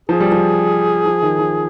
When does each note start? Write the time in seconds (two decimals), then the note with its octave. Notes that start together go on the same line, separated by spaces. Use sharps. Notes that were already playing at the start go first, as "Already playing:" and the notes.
0.09 F3 G#4
0.20 G3
0.32 F3
1.06 F3
1.22 D#3
1.39 F3